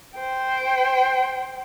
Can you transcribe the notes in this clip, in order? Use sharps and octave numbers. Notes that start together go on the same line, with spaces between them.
C5 G5